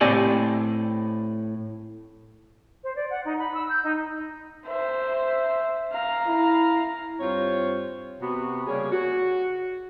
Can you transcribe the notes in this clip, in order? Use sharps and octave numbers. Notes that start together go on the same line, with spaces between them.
A2 C4 G4 D5 G#5
C5
D5
F#5
D#4
B5
E6
G6
D#4
C5 E5
F5 A#5
E4
G2 C4 F4 C5 C#5
C3 B3 F#4
C#3 G3 A#3 G#4 C#5
F#4